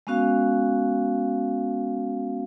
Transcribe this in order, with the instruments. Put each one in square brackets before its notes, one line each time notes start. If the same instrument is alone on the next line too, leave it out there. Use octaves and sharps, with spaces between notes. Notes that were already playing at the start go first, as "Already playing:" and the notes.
[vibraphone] G#3 B3 C#4 F#4 F5